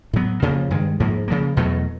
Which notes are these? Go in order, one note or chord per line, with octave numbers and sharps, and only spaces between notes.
A2 F#3 B3
F2 C#3 F3 A#3
G2 D#3 G#3
G#2 F3 A#3
C#3 F3 A#3
E2 B2 F#3 A3